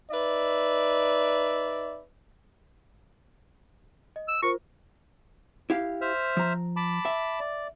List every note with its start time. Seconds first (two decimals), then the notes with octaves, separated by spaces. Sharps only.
0.11 D#4 B4 D5 E5
4.16 D#5
4.28 E6
4.43 F4 A#4 C5 C#6
5.70 E4 G4 F5
6.01 C5 E5 F6
6.37 F3 A#5
6.76 A5 B5 D6
7.05 E5
7.40 D5